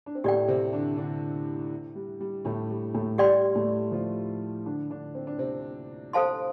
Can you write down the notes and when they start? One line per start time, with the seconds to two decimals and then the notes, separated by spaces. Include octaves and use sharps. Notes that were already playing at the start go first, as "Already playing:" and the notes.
0.06 D4
0.15 C4
0.24 A2 A3 G4 D5 G5
0.48 C3 C4
0.73 D3 D4
0.97 D3 D4
1.95 G3
2.20 G3
2.45 A2 A3
2.70 G3
2.94 A2 A3
3.18 G3 G4 D5 G5 C6
3.55 A2 A3
3.92 F3 F4
4.66 D3 D4
4.90 D3 D4
5.15 C4
5.27 D4
5.39 C3 C4
6.13 A4 C5 F5 A5 C6